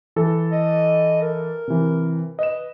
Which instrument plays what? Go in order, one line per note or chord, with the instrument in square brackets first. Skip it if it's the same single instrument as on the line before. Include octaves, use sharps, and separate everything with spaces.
[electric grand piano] E3 A4
[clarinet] D#5
A#4
[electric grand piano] C3 E3
[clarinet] B4 [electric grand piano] D#5 E7